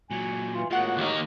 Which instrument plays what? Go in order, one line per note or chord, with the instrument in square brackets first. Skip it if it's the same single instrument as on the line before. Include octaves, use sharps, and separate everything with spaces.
[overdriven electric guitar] A#2 F#3 [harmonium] G#5
[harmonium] E3 F4
[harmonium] A2 A#3 F#4 [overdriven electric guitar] D#3 G#3 [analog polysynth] F4 F#5
[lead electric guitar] D#2 D#4